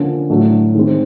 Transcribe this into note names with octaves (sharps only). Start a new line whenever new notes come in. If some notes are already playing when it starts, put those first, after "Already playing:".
Already playing: D3 F3 A#3 C#4
A2 F#3 A3 D4 F#4
D#3 G#3 C4